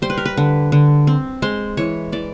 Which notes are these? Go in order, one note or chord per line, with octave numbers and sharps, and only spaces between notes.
G3 C5
B4
A#4
B4
D3
D3
C4
G#3 C5
E3 C#5
E3 D5